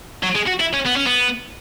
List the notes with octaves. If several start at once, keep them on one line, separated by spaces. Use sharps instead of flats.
F#3
G#3
F#4
E4
C#4
B3
C#4
B3